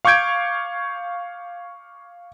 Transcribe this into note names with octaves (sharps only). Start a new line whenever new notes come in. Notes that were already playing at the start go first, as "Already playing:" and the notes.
F5 C#6 D6 G6 G#6 D7